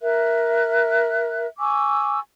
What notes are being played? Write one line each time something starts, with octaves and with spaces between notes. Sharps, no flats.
A#4 E5 F#6
G#5 C#6 D6 E6